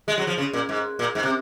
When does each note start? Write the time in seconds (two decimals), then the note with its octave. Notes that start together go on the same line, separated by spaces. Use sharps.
0.08 G#3
0.18 F#3
0.27 F3
0.38 C#3
0.53 A#2
0.69 G#2
0.99 A#2
1.15 G#2
1.23 C3